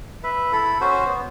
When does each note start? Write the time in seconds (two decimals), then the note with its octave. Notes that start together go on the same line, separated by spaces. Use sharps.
0.23 B4 E5
0.52 E4 A4 B5
0.81 C#4 F#4 C5
1.06 B3